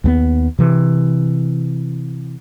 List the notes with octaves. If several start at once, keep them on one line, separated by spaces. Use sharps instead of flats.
D#2 G3 B3
C3 E3